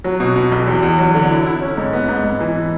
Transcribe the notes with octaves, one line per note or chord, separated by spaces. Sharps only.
F#3
B2
B2
B1
E2
E2
F#3
D3
E4
E4
C#4
G#2
B3
G#2
G#2
E3